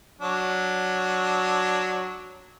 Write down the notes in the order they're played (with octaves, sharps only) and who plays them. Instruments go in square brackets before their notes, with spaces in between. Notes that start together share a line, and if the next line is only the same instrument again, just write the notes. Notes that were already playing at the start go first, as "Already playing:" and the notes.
[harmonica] F#3 D4